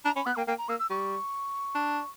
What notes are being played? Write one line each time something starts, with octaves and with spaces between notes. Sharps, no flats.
D4 A#5
C#4 B5
B3 F#6
A#3 G5
A#3 G5
A#5
A#3 E6
E6
G3 C#6
D4